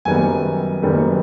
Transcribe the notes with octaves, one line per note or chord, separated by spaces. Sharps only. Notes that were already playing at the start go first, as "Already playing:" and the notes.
F#1 F#2 D#3 G3 B3 G#5
F#1 F#2 D#3 G3 B3